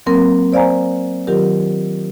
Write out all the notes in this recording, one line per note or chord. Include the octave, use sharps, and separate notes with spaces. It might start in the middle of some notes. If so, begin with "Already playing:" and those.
F#3 A#3 C4 A#4
C5 D5 F5 G#5 A#5
D#3 F#3 F4 G4 A#4